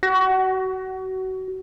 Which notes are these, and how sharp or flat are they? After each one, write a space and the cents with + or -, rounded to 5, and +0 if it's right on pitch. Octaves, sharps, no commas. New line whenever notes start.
F#4 +30